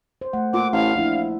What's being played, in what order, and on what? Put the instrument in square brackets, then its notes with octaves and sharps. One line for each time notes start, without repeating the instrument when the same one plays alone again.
[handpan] C5
A3 F#5
[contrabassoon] A#2 [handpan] F#5 [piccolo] D6
[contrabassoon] A1 [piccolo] F5
[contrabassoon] A#1 [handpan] D4 E4